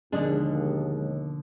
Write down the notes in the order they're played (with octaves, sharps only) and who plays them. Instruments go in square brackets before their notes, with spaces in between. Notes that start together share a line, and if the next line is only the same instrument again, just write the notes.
[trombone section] D#2 [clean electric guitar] B2 D3 F3 [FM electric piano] G#3 [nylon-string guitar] D4